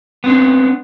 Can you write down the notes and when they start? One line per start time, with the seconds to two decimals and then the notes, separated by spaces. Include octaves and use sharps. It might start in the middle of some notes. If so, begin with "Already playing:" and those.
0.24 B3 C4 D4